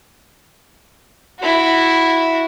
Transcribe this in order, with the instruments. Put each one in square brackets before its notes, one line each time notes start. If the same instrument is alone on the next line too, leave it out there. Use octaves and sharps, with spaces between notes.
[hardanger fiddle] E4 F#4